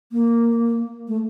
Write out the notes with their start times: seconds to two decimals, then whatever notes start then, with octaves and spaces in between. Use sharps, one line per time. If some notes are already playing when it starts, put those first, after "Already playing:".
0.12 A#3
1.08 A3